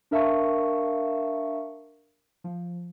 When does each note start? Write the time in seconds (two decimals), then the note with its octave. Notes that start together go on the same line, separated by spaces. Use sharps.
0.11 D4 A#4 E5 F5 A5 C#6
2.44 F3